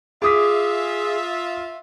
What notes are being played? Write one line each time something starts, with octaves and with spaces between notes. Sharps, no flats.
F4 G#4 E5 D6 D#6 B6